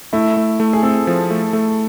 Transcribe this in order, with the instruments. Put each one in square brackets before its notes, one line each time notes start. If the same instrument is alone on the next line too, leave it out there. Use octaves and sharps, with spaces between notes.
[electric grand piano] A3 [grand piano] E4
[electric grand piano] A3
A3
[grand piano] G#4
[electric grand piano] C4 [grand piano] A4
[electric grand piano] F3
A3
A3